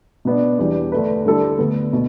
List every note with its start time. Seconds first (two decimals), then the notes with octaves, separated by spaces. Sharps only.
0.25 B2 B3 D4
0.59 E2 E3 G3 D4
0.92 D2 D3 A3 D4 B4
1.25 D3 G3 E4 A4 D5
1.58 D2 D3 B3
1.93 B2